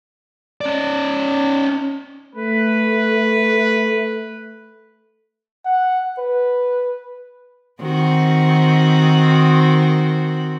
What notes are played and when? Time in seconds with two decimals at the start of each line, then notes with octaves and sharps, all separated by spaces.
0.61 C#4 D5
2.35 A3 B4
5.65 F#5
6.18 B4
7.81 D#3 C4 F#4